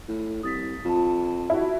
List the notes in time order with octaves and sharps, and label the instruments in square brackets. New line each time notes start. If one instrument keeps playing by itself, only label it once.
[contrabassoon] A2
[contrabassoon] C2 [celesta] D#6 A6 B6
[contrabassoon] F2 [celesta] F4 A5
[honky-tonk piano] E4 F#4